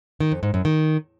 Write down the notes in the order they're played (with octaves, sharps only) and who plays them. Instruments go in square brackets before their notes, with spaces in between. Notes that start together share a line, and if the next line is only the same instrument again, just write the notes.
[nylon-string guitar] D#3
F2
G#2
F#2
D#3